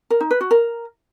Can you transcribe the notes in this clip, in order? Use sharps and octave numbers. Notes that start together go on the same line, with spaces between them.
A#4
D#4
B4
F#4
A#4